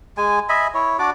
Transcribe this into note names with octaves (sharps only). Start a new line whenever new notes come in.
G#3 G#5
D#5 E5 G#5 B5
E4 C#5
D4 F#4 D5 D6